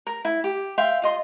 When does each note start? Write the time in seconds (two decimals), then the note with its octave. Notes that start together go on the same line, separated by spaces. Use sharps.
0.07 A#4
0.25 E4
0.44 G4
0.78 E5 F5 G5 C6
1.02 F4 D#5 C6